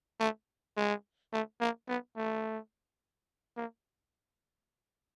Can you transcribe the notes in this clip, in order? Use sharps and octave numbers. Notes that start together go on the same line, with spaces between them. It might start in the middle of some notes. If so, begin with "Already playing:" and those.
A3
G#3
A3
A#3
B3
A3
A#3